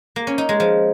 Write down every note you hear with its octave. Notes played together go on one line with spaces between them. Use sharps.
A#3
C#4
D#4
G#3
F3